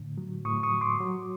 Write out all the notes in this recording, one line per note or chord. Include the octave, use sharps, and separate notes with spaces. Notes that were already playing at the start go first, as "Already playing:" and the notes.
Already playing: A2 D3
F#3
A2 C#6 D#6
C#6 D#6
F#3
C6 D6
F#3